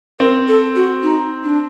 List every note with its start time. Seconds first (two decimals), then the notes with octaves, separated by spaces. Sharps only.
0.20 C4 A#4
0.48 A4
0.76 F#4
1.03 D#4
1.44 D4